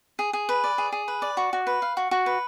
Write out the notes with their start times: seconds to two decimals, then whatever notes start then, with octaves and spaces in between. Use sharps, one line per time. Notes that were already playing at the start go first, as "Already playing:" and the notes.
0.19 G#4
0.33 G#4
0.49 B4
0.64 D5
0.78 G#4
0.92 G#4
1.08 B4
1.22 D5
1.37 F#4
1.53 F#4
1.67 B4
1.82 F5
1.97 F#4
2.11 F#4
2.26 B4